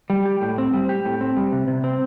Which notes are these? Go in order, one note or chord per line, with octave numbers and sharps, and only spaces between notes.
G3
G4
A2
C4
G3
G4
A2
C4
G3
C3
C3
C4